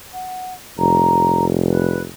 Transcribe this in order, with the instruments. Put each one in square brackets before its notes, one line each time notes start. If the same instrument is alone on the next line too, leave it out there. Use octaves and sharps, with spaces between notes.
[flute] F#5
[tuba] F1 [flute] A#5
[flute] B4